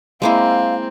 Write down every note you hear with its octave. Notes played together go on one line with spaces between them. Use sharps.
G#3 A#3 C4 E4 F5